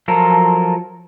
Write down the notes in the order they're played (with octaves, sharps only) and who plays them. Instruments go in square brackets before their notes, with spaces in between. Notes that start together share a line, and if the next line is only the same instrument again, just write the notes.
[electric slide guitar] F3 F#3 F4 A4 A#4